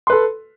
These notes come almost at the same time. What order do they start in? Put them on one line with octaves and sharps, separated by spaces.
C6 B4 A4